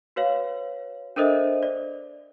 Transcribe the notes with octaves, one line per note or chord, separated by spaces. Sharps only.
F#4 B4 C#5 F5
D4 A4 A#4 C5 D#5 E5
D5